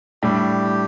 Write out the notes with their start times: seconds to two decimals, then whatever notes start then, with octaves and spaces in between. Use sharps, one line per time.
0.23 A2 G3 D4 G4